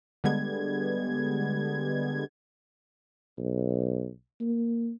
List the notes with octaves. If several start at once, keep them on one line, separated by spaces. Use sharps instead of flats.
D3 G3 G#3 B3 G#6
B1
A#3